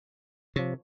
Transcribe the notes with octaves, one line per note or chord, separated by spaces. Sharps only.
C3 F3 C#5